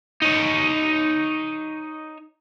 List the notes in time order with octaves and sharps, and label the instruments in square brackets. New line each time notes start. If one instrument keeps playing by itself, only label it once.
[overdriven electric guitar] D#4 C#5